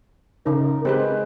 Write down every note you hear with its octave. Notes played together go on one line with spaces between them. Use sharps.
C#3 D#4 A#4
G#3 C4 G4 B4